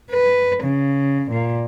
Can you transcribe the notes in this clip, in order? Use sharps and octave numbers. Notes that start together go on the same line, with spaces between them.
B4
C#3
A#2